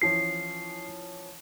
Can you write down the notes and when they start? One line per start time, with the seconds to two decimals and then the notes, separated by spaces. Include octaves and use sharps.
0.02 E3 F3 C#4 C7